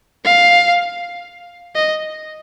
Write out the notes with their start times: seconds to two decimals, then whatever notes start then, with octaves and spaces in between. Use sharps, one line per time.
0.24 F5
1.75 D#5